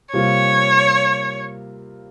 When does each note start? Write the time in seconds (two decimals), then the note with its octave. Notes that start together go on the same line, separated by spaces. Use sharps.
0.13 C3 G3 A#3 F4 A#4 C#5